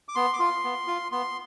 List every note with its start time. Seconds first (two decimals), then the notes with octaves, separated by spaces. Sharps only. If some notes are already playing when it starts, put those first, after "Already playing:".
0.09 D6
0.15 B3 C6
0.33 D6
0.39 F4 C6
0.64 B3
0.88 F4
1.12 B3 C6